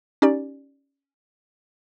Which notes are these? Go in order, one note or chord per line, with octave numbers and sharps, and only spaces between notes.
C#4 D#4 G4 D5